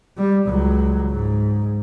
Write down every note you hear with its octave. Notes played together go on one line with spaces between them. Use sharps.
G3
C#2 F#3
G#2